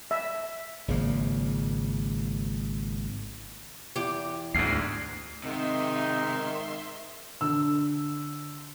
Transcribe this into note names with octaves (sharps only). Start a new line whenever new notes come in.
E5
G#1 C#3 F3 A#3
E2 G4
D2 G#2 C7
G#2 C3 D#3 D#4 E5 C6
D3 E6